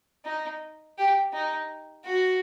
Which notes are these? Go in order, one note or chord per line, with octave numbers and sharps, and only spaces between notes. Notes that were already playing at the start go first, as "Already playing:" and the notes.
D#4
G4
D#4
F#4